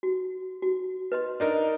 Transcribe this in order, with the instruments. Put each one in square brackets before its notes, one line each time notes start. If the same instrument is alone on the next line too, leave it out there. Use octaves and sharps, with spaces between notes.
[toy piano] F#4
F#4
B4 D#5 C6
[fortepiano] D4 D#4 A#4